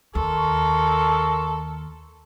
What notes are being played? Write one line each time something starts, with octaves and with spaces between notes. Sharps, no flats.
D#2 A4 A#4 C6 C#6